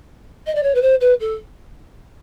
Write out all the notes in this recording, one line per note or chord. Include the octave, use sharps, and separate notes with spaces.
D#5
D5
C#5
B4
C5
B4
A4